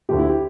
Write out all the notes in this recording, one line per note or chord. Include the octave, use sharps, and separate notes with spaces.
D2 D3 A3 G4
E4
G4